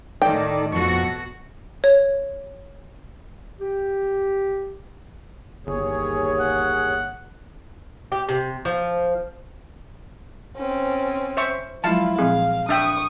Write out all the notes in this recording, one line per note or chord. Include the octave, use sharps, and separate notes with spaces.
A2 D#3 D#4 A4 D5 G5
F2 B2 F#4 A4 C#6
C#5
G4
G1 D#2 G#4 C#5
F#5
G4
C3
F3
C4 C#4
C5 E5 C#6
F3 F#3 G#3 E4 F4 F5 A5
A#2 F3 C4 G#4 F5
D4 E5 G5 C#6 D#6